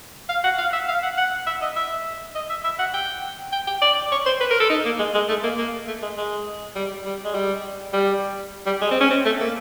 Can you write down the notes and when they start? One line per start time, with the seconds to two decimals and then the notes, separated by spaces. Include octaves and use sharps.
0.29 F5
0.44 F#5
0.58 F5
0.73 E5
0.88 F5
1.03 F#5
1.17 F#5
1.47 E5
1.61 D#5
1.76 E5
2.35 D#5
2.50 E5
2.64 E5
2.79 F#5
2.94 G5
3.52 G5
3.67 G5
3.82 D5
4.11 C#5
4.26 C5
4.40 B4
4.50 A#4
4.60 A4
4.70 D#4
4.85 A#3
4.99 G#3
5.14 G#3
5.29 A3
5.43 A#3
5.58 A#3
5.87 A3
6.02 G#3
6.17 G#3
6.76 G3
7.05 G3
7.24 G#3
7.34 G3
7.93 G3
8.66 G3
8.81 G#3
8.91 C4
9.01 C#4
9.10 C4
9.25 A3
9.40 A#3